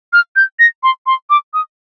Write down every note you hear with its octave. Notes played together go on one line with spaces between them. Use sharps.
F6
G6
A#6
C6
C6
D6
D#6